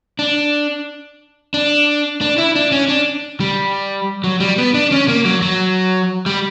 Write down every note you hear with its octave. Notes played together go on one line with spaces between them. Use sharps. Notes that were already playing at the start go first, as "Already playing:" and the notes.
D4
D4
D4
E4
D4
C#4
D4
G3
F#3
G3
B3
D4
C#4
A#3
F#3
F#3
G3